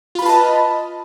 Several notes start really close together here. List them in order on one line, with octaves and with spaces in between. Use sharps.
F4 B5 B4 A5 D#5